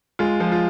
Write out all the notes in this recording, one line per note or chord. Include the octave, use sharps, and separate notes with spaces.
G#3 F4
F3
F4